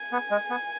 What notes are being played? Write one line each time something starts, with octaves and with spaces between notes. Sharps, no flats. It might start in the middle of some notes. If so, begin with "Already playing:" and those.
Already playing: G#5
B3
G#3
B3